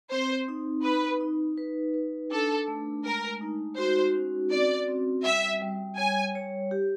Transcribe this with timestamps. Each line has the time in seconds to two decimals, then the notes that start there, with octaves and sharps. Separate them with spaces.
0.11 C4 C5
0.48 D#4
0.84 D#4 B4
1.21 D#4
1.58 B4
1.94 B4
2.31 D4 A4
2.68 A3
3.05 G#3 A#4
3.41 D#4
3.78 F#4 C5
4.15 C#4
4.52 C4 D5
4.88 C4
5.24 G3 E5
5.62 G3
5.97 C#5 G#5
6.35 C#5
6.71 G4